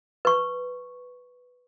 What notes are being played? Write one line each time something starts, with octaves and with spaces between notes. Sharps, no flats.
B4 C#6